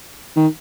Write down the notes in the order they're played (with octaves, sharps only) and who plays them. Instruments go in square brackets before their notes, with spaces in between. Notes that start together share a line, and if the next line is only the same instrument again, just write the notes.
[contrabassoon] D#3